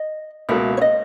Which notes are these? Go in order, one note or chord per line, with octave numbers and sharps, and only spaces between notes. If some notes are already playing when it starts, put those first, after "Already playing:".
Already playing: D#5
C#2 B2 A#3 E5
C#5
D#5